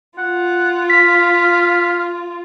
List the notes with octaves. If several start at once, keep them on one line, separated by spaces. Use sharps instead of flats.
F4 F#5
F5 B6